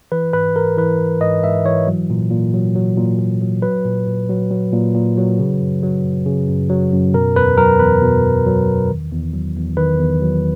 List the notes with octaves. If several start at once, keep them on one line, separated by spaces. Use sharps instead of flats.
E3 B4
G#2 B4
G#2 A#4
E3 B4
E3
G#2 D#5
G#2 E5
E3 C#5
F#3
A#2
A#2
F#3
F#3
A#2
A#2
F#3
F#3 B4
A#2
A#2
F#3
F#3
A#2
A#2
F#3
C#3
F#2
F#3
F#2
C#3
F#2
F#3
F#2
B2 A#4
E2 B4
F#3 A#4
E2 B4
B2
E2
F#3
E2
D#3
E2
F#3
E2
D#3 B4
E2
F#3